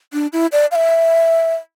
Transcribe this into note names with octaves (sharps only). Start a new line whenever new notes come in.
D4
E4
D5
F5
E5